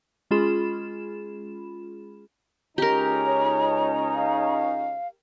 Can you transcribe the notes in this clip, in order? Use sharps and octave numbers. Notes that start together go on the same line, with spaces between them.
G#3 C#4 F4 G#4 B5 E7
C#2 C#4 D#4 G4 A#4 A#5
C#5
F5